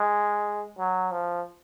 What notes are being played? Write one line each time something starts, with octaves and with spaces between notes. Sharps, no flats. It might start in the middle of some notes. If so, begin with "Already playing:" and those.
Already playing: G#3
F#3
F3